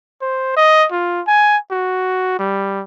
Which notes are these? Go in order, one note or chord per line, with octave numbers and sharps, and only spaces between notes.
C5
D#5
F4
G#5
F#4
G3